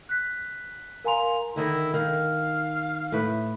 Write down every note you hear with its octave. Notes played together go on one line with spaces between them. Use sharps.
F#6 B6
A#4 F5 G#5 A#5 C6 F7
D3 D#3 E4 D#5
D#3 F5
A2 B4